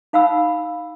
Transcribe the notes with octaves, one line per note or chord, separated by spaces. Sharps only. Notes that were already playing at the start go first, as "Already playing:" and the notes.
D#4 F5 F#5 B5 E6